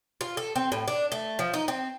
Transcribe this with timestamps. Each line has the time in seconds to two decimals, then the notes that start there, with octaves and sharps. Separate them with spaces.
0.21 F4
0.37 A4
0.56 C4
0.72 A2
0.88 D4
1.12 A3
1.39 F3
1.54 D#4
1.68 C4